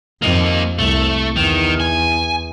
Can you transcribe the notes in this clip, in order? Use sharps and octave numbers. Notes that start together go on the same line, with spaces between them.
F2 A#3 D#4
C2 A3
E2 D#3
G#5